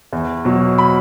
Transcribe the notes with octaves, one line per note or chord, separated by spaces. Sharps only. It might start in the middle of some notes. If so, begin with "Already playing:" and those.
E2
B2 F#3
B5